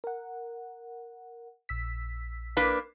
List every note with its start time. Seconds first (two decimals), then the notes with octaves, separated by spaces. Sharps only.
0.04 A#4 F#5
1.69 A#1 E6 B6
2.57 A#3 D4 B4